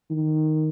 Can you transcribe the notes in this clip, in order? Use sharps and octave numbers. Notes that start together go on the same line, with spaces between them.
D#3